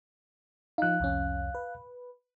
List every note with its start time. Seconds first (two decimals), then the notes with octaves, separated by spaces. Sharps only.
0.78 F3 D#4 F5 F#6
1.00 C2 F2 C#4
1.55 B4